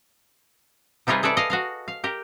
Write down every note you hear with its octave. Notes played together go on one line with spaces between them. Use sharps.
C3 G3 D#4 F4 G#4 B4
G#4 A4 B4 D5 E5
D#5 F5
F#4 D#5 F5
F5
G4 A#4